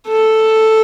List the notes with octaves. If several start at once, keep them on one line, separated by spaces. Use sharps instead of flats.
A4